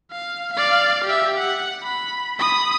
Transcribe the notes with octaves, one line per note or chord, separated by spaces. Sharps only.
F5
D5 F5
G4 E5
F#5
B5
B5 D#6